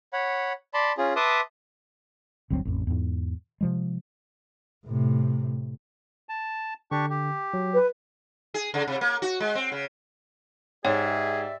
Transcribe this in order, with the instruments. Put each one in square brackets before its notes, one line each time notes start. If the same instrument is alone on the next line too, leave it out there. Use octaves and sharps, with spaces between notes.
[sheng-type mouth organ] C#5 F#5 B5
D5 A5 B5 C6
C#4 F4 G#4
B4 E5 A5 C6 D6 D#6
[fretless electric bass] G1 D2 F#3 C4
A1 F2
E2 G#2
C3 F3 G#3
[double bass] A2 C3
[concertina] A5
[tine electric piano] D3 [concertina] D4 G4 C#6
[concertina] G4
[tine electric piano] F#3
[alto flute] B4
[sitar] G#4
C#3
C3
A#3
F#4
G#3
C4
C#3
[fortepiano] G#2 [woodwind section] G4 D5 E5 [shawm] G#4 [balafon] C#5 G5